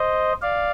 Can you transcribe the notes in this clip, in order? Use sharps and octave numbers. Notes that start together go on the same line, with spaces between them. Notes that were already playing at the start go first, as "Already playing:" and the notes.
Already playing: C5 D#5
D5 F5